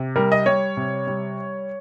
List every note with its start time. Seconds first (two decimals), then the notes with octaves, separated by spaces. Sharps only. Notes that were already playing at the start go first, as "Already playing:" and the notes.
Already playing: C3
0.16 G3 A#4
0.32 D#5
0.46 G3 C#5
0.77 C3
1.07 G3